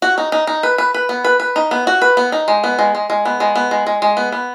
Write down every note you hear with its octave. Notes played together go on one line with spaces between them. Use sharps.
F#4
D#4
D#4
D#4
B4
B4
B4
B3
B4
B4
D#4
B3
F#4
B4
B3
D#4
G#3
B3
G#3
G#3
G#3
B3
G#3
B3
G#3
G#3
G#3
B3
B3